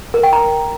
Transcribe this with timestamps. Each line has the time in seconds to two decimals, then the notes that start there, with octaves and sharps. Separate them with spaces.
0.14 A#4
0.23 G5
0.33 A#5